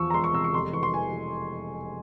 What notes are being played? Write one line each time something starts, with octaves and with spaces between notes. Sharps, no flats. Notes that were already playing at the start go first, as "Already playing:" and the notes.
Already playing: E2 F3 C#6 E6
A#5
E1 C6
C#6
C3 E6
C#6
F1 C6
E3 C#6
C6
E3 G#5
E3